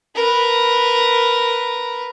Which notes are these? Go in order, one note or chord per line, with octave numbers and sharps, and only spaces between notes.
A#4 B4